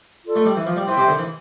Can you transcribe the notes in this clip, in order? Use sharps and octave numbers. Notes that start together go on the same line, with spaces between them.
F4 A4 D5
A3
G3
E3
F3
G3
E3 C5 E5 G5 C6
C3
D3
E3